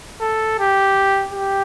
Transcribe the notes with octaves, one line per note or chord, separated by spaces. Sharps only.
A4
G4
G4